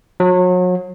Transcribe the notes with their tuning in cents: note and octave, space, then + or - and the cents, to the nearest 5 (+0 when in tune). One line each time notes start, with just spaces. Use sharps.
F#3 -35